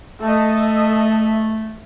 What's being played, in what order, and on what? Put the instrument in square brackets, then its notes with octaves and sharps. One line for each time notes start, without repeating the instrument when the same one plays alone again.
[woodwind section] A3 [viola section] A4 D#5 [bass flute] E5